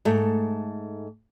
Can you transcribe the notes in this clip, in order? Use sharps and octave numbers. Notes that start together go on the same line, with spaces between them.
G#2 A3